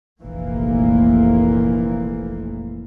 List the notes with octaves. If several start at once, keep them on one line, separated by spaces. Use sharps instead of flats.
F1 A#1 A#2 E3 A#3